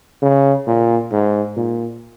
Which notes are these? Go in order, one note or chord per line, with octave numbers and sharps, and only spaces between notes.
C#3
A#2
G#2
A#2